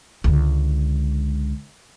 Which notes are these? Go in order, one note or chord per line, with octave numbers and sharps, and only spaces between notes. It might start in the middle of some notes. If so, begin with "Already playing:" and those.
C#2 D3